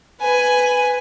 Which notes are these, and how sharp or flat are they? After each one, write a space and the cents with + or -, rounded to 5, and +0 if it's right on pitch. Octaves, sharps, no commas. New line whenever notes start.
B4 +5 G#5 +0